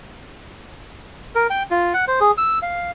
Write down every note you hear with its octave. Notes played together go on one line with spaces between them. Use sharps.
A#4
G5
F4
F#5
C5
G#4
E6
F5